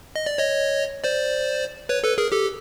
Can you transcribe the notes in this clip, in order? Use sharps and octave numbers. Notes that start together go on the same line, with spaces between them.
D#5
D5
C#5 D#5
C5 D5
B4 C#5
A4 B4
G#4 A#4
G4 A4